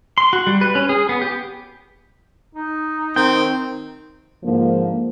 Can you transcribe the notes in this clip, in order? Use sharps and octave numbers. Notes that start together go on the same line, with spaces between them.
C6
F#4
G3
B4
C#4
G#4
B3
G4
D#4
D#3 C4 G5
G#2 D3 F3 A#3